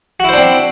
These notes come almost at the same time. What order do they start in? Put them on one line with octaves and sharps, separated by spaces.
F#4 E4 C5 D4 C4